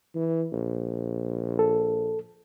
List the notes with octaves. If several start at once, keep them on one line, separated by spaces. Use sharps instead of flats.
E3
A#1
A4